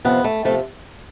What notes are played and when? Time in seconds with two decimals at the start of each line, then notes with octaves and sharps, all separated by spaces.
0.05 F2 C3 F3 B3
0.24 A3
0.45 C3 F3 A3